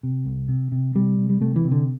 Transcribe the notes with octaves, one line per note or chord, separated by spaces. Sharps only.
C3
C2
C3
C3
C3 G3
C3
G3
C3 A3
E3
C3
D3